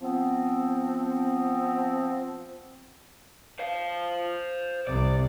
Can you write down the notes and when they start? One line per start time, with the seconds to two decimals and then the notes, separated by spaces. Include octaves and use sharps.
0.01 F3 B3 C4
3.59 C5 F5
4.87 C2 C3 D5